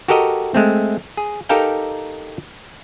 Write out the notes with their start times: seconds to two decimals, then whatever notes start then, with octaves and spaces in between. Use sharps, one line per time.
0.08 F#4 G4 A4 A#4 D#5
0.54 G#3 A3 C4
1.17 G#4
1.49 D#4 G4 A4 A#4 F5 G5